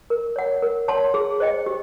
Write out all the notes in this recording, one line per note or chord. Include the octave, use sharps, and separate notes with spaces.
A#4
C#5 F#5
A#4
C#5 F#5 A5 C6
G#4
C5 D#5 G5
G4